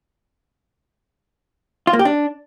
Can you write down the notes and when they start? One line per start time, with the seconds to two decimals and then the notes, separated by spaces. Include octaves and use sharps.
1.87 F4
1.93 A#3
1.99 G4
2.05 D4